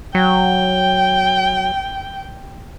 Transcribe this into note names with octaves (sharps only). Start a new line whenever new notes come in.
F#3 G5